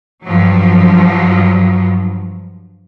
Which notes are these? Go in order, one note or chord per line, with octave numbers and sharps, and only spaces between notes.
G2 F3 F#3